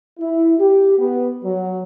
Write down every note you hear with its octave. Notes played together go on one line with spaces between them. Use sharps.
E4
G4
B3
F#3